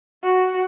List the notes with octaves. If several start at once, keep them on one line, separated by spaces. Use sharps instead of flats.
F#4